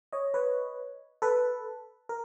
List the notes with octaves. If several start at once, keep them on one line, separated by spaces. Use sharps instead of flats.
C#5 D#5
B4 C#5
A4 B4
A#4